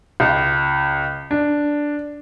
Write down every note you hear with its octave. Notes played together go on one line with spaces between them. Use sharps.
C#2
D4